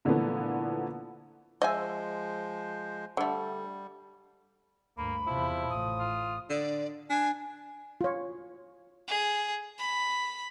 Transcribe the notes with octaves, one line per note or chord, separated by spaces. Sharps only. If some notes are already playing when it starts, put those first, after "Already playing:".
A#2 D3 E3 F3 A3 B3
F3 G#3 C5 D#5 E5 G#5
D3 G3 A3
D2 G2 A#3 B5
E2 C3 F3 E4
A1 A2 D#6
F4
D3 D5
D4 G#5
F4 C#5
G#4
B5